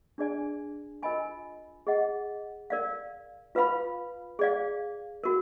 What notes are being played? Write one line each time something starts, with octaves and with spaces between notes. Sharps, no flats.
D4 G#4 D5 G#5
F4 A#4 D#5 G#5 B5
G#4 D#5 F#5
A#4 D5 F5
F4 B4 F5 B5
G#4 D5 F5
F#4 A#4